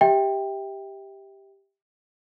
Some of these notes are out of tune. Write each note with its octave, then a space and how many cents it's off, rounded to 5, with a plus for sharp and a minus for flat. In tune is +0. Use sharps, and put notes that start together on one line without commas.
G4 +0 E5 -25 G5 +10